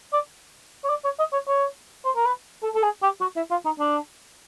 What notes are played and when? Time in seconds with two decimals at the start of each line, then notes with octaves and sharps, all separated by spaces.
0.13 D5
0.84 C#5
0.90 D5
1.05 C#5
1.19 D#5
1.33 C#5
1.48 C#5
2.05 C5
2.16 A#4
2.26 B4
2.63 A4
2.75 A4
2.83 G#4
3.03 G4
3.21 F#4
3.36 E4
3.51 F4
3.65 D#4
3.80 D4